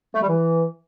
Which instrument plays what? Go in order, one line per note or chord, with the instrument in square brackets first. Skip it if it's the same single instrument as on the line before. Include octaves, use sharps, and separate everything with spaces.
[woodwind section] A3
G3
E3